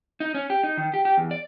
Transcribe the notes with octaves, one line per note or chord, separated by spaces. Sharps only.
D#4
C#4
G4
D#4
D#3
G4
G4
E2
D5